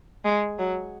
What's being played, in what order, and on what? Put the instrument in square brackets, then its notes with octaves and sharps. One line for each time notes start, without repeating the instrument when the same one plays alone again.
[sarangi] G#3
F#3